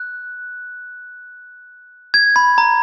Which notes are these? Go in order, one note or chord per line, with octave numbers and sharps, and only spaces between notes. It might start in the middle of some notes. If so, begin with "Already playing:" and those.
Already playing: F#6
G#6
B5
A#5